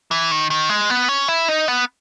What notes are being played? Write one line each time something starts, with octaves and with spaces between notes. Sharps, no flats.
E3
D#3
D#3
G#3
B3
C#4
E4
D#4
B3